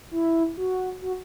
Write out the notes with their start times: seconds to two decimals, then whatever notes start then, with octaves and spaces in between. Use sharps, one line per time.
0.11 E4
0.58 F#4
1.02 F#4